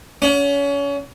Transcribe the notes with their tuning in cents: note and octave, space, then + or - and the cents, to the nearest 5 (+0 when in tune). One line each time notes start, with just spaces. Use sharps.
C#4 +30 F#5 -25